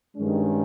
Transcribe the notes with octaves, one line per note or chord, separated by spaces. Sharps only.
G2 D#3 G#3 C#4